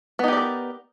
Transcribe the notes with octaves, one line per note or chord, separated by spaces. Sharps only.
B3 D#4 G4 A#4 D5